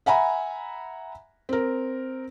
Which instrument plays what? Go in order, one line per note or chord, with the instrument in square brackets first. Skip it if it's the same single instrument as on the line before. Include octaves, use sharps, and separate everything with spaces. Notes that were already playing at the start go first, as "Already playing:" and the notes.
[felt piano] E5 F#5 G#5 A#5 B5
C4 A#4